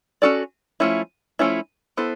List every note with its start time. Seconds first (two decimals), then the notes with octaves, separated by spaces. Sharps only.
0.22 C#4 F#4 A4 D5
0.80 F3 A3 C#4 E4
1.39 F3 A3 C#4 E4
1.97 B3 E4 A4 C5